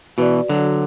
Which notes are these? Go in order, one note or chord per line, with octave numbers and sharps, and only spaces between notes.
B2 E3 F#4 B4 D5
D3 F#3